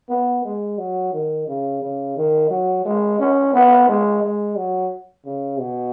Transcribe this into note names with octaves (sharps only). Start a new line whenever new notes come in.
B3
G#3
F#3
D#3
C#3
C#3
D#3
F#3
G#3
C#4
B3
G#3
G#3
F#3
C#3
B2